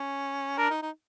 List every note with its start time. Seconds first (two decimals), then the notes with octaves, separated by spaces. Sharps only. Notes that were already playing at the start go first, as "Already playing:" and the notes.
Already playing: C#4
0.58 D4 A#4
0.70 D#4
0.82 D#4